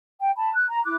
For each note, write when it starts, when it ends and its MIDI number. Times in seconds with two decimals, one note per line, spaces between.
0.20 0.31 79
0.37 0.52 81
0.37 0.52 83
0.55 0.66 90
0.68 0.82 82
0.85 0.96 64
0.85 0.96 86
0.85 0.96 90